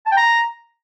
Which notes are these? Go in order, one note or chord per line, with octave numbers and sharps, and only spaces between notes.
A5
G5
A#5